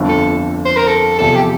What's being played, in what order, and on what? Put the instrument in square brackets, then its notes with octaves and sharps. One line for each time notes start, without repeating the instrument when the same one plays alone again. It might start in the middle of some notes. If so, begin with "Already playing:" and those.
Already playing: [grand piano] G1 F2 D3
[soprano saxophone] A4
C5
A#4
A4
[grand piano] E2 C3 F3 [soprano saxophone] A4
[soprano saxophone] G4